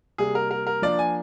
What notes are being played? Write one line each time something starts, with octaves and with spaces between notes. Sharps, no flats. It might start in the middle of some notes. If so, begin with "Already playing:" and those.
C3 G3 A#3 G#4
A#4
A#4
A#4
F3 A#3 D4 D5
G#5